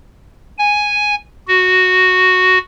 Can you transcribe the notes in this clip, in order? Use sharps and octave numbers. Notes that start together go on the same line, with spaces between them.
G#5
F#4